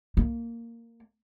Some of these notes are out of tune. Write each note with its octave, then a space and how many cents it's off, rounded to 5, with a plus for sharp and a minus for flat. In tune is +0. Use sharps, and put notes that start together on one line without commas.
A#3 -10